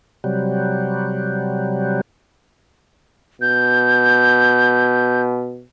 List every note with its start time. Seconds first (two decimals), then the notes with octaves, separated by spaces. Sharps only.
0.24 C3 F#3 G3
3.41 B2 G6